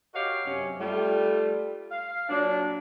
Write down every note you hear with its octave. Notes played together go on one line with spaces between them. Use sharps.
F#4 G4 A#4 C#5 D#5 F5
F#2 C3 C#4
G3 A3 F4
F5
A#2 F#3 A#3 D4